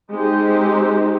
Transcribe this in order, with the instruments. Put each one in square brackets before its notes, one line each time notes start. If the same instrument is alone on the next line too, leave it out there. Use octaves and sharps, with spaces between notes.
[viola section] G#3 C4 D#4 G4 G#4 C5